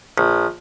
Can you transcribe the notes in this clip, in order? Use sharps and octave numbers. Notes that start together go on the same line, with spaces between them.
A#1